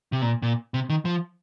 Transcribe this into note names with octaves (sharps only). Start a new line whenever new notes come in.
C3
A#2
A#2
C3
D#3
F3